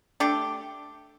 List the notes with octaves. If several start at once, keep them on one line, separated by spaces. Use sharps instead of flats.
A3 D4 G4